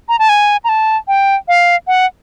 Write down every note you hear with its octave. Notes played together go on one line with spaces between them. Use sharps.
A#5
A5
G#5
A#5
A5
G5
F5
F#5